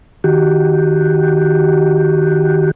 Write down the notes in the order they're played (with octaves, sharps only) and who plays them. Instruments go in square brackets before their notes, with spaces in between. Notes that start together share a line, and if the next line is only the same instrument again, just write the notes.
[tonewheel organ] D#3 F#4 G4